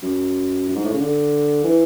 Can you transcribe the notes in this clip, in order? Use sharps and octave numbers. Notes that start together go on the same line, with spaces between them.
F#2
F#2
G#2
A2
C#3
D3
E3